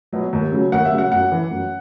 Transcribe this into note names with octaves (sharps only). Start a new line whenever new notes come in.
B2 F#3
D#2
C#3 F#3
D#2 F#5
E5
C#3 F#3
F#5
F#2 F#5
E3
F#2